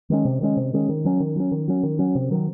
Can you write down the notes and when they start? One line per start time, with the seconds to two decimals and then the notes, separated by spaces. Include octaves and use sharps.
0.10 D#3 G#3 C#4
0.25 C3
0.41 D#3 G#3 C#4
0.57 C3
0.73 D#3 G#3 C#4
0.89 D#3
1.05 F#3 C#4
1.20 D#3
1.36 F#3 C#4
1.52 D#3
1.68 F#3 C#4
1.83 D#3
1.99 F#3 C#4
2.15 C3
2.31 D#3 F#3